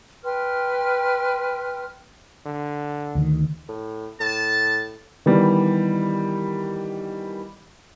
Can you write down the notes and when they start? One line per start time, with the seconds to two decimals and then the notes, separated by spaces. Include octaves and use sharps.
0.24 B4 G5 C6 F6
2.46 D3
3.15 D2 D#3
3.69 A2
4.20 A2 A5
5.26 D#3 E3 G3 B3